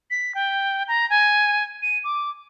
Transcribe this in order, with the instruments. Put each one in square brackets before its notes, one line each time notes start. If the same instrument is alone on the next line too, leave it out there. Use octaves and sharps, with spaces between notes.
[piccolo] B6
G5
A#5
G#5
D#7
D6